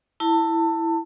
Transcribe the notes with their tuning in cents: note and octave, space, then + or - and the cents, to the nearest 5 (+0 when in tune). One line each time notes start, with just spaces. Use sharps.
E4 +0 A5 +25